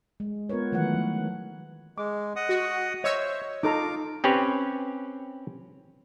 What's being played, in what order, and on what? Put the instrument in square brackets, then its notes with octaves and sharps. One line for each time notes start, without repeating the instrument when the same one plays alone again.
[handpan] G#3
B3 F4 A#4 B4 C#5
D#3 E3 F#3 A3 B4 F#5
F3
[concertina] G#3 [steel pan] D6
[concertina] D#5 F#5 D#6
[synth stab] F#4
[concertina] C5 E5 [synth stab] C#5 [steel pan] D#5 E6
[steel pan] D#4 A4 A#5 [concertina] F4 D6
[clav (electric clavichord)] C4 C#4 G4 B4 C#5